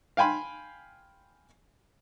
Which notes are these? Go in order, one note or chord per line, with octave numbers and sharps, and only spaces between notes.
F5 G5 G#5 B5 C6